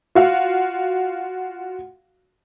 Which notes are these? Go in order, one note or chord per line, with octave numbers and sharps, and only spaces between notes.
F4 F#4 F5